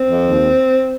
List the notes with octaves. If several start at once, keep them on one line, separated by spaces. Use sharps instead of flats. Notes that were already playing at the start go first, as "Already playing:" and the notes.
Already playing: C4
F2
D#2